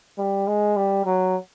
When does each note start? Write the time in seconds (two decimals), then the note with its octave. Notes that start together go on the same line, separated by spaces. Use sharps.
0.18 G3
0.47 G#3
0.76 G3
1.06 F#3